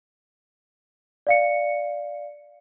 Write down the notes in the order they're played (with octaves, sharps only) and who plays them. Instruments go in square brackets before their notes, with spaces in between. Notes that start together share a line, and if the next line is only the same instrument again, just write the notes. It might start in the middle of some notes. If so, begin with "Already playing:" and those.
[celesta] D5 F5 C#7